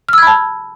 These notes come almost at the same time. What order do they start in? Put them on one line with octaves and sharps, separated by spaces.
F6 E6 G#6 B5 A5